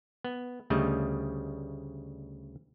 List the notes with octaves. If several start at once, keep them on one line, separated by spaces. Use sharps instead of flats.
B3
D2 C#3 G3 A3 D#5